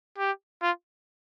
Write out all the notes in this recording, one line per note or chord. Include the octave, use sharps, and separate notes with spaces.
G4
F4